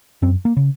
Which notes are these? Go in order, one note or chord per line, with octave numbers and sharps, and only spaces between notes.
F#2 C4
A#3
C#3